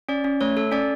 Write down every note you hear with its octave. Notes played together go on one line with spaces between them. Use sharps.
C#4 D5
C#4
A3 C#5
A4
C#4 D5